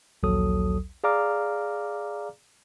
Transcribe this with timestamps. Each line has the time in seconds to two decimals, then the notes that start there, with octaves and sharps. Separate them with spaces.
0.23 A#1 D#2 F#3 A4 D#6
1.04 G#4 D5 F5 A#5 D6 F6